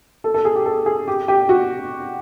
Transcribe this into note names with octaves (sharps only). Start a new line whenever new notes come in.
A4
A4
G#4
G4
A4
G#4
G4
G4
F#4